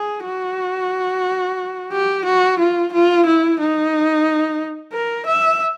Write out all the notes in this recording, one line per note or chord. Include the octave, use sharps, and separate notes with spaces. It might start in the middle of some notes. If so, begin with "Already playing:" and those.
Already playing: G#4
F#4
G4
F#4
F4
F4
E4
D#4
A#4
E5